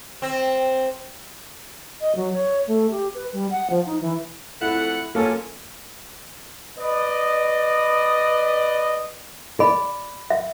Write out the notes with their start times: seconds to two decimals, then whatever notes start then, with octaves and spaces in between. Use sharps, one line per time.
0.22 C4
2.01 D#5
2.15 F#3
2.33 C#5
2.67 A3
2.91 G4
3.15 B4
3.33 G3
3.51 F#5
3.70 F3
3.86 D#4
4.01 E3
4.61 F2 A3 E4 F#5
5.15 A#2 F#3 A#3 C#4 A4
6.79 B4 D5 D#5
9.60 D5 B5
10.30 E5